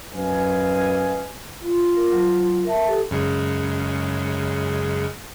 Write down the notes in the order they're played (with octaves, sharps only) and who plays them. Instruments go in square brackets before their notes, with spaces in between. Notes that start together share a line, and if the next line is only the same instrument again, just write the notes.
[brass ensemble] F#2 B4 D#5 F5 G#5
[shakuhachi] F4
[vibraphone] A#4
F#3
A#4 E5 A5
[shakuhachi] G4 [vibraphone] A4
[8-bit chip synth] F#2 C#3 G#3